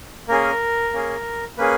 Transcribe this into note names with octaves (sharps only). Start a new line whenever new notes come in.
A#3 C#4 G#4 A#4
A#3 C#4 G#4
A#3 C#4 G#4 B4